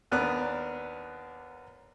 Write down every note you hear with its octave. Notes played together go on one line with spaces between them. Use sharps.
D#2 B3 D4 A#4 F6 F#6